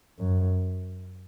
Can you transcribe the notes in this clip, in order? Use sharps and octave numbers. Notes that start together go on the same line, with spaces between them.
F#2